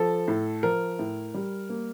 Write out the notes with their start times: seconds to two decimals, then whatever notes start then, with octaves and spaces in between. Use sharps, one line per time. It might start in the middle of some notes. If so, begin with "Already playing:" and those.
Already playing: F3 A4
0.28 A2
0.63 F3 A#4
0.99 A2
1.34 G3
1.70 A#3